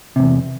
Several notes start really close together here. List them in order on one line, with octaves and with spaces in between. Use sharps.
C3 G#2 E2